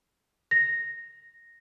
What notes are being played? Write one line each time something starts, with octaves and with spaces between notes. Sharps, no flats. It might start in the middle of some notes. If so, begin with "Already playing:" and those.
A#6